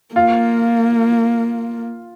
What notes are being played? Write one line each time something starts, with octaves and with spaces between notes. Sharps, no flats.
A#3 F4